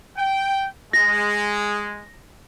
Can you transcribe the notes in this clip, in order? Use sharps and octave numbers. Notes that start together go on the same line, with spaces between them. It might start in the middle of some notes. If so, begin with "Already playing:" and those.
G5
G#3 A#6